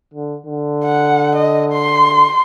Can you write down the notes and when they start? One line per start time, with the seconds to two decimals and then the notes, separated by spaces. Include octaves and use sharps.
0.14 D3
0.46 D3
0.85 F#5
1.35 D#5
1.72 C6